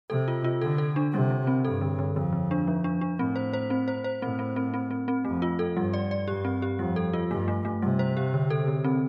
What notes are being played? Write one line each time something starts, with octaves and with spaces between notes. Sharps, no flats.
C3 A4
F4
F4
D3 A4
A4
D4
C3 G3
G3
C4
G2 A4
D3
D3
F2 D3
D3
D4
F3
D4
D4
A2 C4
C5
C5
C4
C5
C5
A2 C4
C4
C4
C4
C4
C4
F2 A3
F4
A4
G2 G3
D5
D5
G2 G4
C4
G4
F2 G3
A4
F4
G2 A3
A3
A3
C3 G3
C5
G4
D3
A4
D3
C4